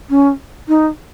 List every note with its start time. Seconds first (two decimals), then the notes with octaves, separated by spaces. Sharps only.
0.10 C#4
0.68 D#4